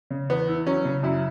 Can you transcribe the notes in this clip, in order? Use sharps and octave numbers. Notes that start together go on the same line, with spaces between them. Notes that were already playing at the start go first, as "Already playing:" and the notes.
C#3
E2 B3
E4
F#3 C#4
C#3
F#2 E4